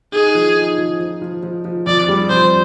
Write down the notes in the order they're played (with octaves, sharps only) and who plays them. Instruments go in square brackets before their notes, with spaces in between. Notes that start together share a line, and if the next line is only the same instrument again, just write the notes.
[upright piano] D#4 [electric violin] G#4
[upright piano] F3
D#4
F3
F3
F3
F3
F3
[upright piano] F2 [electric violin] D5
[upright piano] G3
[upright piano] F2 [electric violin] C5